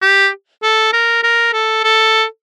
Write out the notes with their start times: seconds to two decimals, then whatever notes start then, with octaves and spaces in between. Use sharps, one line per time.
0.02 G4
0.63 A4
0.93 A#4
1.23 A#4
1.53 A4
1.84 A4